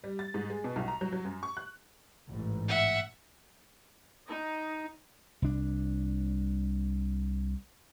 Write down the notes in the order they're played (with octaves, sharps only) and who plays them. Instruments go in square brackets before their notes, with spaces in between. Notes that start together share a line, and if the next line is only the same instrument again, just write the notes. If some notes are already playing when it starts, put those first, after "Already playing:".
[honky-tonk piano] G3
A6
G#2
G#3
B2
B1
A#5
F#3
F#3
F#2
C#6
F#6
[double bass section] A1 G#2
[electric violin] E5 F#5
[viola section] D#4
[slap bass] C2 D4